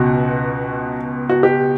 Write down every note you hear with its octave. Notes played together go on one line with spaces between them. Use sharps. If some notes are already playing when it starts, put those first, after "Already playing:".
Already playing: C#2 B2 F#4
F#4
G4